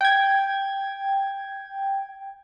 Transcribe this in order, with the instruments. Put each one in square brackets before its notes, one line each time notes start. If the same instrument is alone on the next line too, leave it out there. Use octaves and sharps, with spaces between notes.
[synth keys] G5 G#6